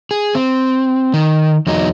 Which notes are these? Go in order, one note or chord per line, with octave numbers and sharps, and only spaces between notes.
G#4
C4
D#3
E2 F#3 D#4